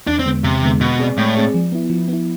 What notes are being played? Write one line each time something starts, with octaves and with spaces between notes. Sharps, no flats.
E2 D4
C4
D3 G#3 B3
E2 C3
D3 G#3 B3
B2 G#3
C4 G#4 D5
A2 G#3
C4 G#4 D5
F3
B3 E4
F3
B3 E4